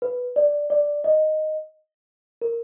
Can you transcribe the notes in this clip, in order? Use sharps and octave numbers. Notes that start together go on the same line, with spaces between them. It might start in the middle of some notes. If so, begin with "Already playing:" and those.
B4
D5
D5
D#5
A#4